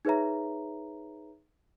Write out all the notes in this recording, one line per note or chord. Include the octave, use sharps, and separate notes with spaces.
D#4 G#4 B4 C#5 E5 A#5